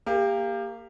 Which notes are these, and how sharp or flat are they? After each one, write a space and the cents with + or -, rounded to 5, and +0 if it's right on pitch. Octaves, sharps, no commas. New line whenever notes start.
A#3 -15 G4 +25